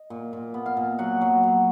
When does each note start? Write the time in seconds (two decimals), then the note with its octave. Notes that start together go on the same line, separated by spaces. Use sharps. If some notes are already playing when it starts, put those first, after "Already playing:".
Already playing: D#5
0.10 A#2
0.33 A#2
0.54 B3
0.66 F5
0.77 A#2
0.99 F#3 F#5
1.21 F#3
1.43 F#3